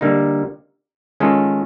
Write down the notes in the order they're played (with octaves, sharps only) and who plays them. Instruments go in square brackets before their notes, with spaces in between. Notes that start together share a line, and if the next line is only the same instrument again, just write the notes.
[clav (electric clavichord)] D3 G3 A#3 D#4
D#3 G#3 C#4 F4 A4